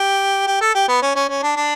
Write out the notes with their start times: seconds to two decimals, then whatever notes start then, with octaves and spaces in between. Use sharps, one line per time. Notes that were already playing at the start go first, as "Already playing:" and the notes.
Already playing: G4
0.47 G4
0.62 A4
0.75 G4
0.89 B3
1.02 C#4
1.16 C#4
1.29 C#4
1.43 D4
1.57 D4